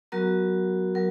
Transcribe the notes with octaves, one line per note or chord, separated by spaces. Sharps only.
F#3 B3 F#4 A#4 A#5
F#3 A#4